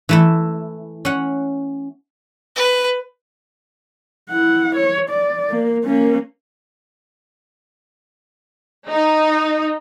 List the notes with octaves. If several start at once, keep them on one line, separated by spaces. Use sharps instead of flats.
E3 A3 E4
C#4 F#5
B4
E4 F#5
C#5
D5
A#3
A#3 C#4
D#4